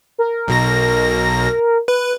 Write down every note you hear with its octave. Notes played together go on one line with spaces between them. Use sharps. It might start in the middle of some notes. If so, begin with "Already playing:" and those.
A#4
B1 B2 A#6
B4